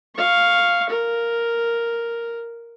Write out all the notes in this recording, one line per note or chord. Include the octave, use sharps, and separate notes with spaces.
F5 C#6
A#4